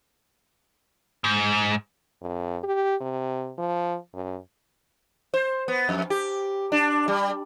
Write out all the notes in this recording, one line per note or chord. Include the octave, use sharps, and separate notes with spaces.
G#2
F2
G4
C3
F3
F#2
C5
B3
F2
G4
D4
G3